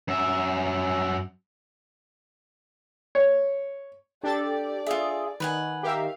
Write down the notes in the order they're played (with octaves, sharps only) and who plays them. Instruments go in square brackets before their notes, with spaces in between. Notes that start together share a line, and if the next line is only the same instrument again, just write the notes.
[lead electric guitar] F#2 E5
[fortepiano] C#5
[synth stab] D4 A4 A6 [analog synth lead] G4 [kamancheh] D5
[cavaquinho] F4 E5 [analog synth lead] G#4
[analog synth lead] D#3 [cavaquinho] B4 F#5 G#5
[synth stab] G4 A#4 E5 [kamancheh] F5